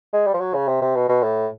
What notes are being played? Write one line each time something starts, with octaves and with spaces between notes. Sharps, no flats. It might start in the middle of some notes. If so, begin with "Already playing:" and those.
G#3
G3
F3
F#3
C#3
C3
C3
B2
B2
A2